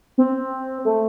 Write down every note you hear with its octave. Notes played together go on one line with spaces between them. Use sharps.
C4
A3